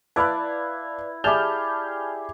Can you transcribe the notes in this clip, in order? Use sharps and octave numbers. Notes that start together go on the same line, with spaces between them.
E4 B4 D5 F5 A5 B5 F#6
G4 G#4 D5 E5 A5 B5 F6 G6